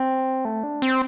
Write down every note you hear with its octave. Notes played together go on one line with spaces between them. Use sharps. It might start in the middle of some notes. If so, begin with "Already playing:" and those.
Already playing: C4
A3
D4
C4